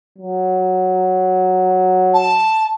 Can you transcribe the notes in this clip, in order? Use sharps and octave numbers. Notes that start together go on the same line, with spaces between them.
F#3
A5